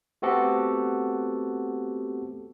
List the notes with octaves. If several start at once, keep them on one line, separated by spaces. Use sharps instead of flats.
A3 B3 C4 F#4 G4 A4